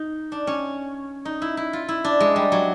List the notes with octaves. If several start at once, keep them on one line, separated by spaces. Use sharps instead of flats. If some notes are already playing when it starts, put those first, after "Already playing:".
Already playing: D#4
D4
C#4
D#4
E4
E4
F4
E4
D4
G#3
G3
F#3